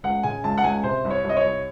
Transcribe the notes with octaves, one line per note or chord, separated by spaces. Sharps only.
C#2 F#5
C#3 G#5
C#2 A5
F#5
C#2 G#5
C3 C5
C2
C#5
C2
D#5
C#5
C2